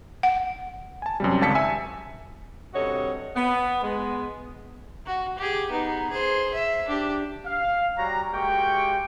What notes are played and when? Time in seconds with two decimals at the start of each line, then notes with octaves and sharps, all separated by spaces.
0.23 F#5
1.02 G#5 A5
1.20 F#2 C3 G3
1.41 G#1 C#2 A5 B6 C#7
1.55 E5 G#5 E6
2.74 G2 C3 F#4 A4 C#5 D#5
3.36 B3
3.82 G#3 B3
5.06 F#4
5.38 G4 G#4
5.70 B3 D#4
6.10 G#4 C5
6.54 E5
6.88 D4 G4
7.46 F5
7.98 G3 F#4 C#5 A#5
8.33 G#3 A#3 F#4 G4 G5 C#6